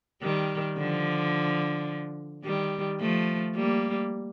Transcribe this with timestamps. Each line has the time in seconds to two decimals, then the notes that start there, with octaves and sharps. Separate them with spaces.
0.22 D#3 G3
0.77 D3 F3
2.44 D#3 G3
3.00 F3 A3
3.56 G3 A#3